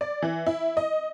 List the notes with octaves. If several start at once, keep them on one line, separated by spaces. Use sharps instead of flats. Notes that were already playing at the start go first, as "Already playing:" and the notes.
D5
E3
E4
D#5